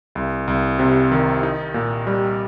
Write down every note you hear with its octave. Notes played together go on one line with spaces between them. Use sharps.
C2
C2
C3
D#3
D#4
A#2
G3